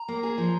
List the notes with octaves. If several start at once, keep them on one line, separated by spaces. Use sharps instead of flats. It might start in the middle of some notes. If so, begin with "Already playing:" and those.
Already playing: A#5
A#3
G#4
F3